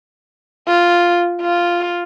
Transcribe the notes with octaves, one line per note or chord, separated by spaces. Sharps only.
F4
F4